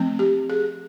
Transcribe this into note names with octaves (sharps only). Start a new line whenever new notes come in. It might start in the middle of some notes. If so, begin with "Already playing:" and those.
Already playing: F3 A3 C4
G4
G#4